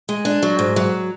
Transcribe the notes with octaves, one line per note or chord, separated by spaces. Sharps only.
G#3
D4
F#3
G#2
F#3